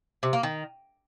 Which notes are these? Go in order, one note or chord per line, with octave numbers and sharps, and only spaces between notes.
C3
A#3
D#3